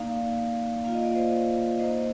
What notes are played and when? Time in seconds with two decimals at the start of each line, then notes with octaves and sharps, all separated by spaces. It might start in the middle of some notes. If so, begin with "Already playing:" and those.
Already playing: A#3 D#4 D5 F5
0.84 A#3 F4 F5
0.94 D#5
1.05 D5
1.15 C5 D#5
1.79 A#3 D#4 C5 D#5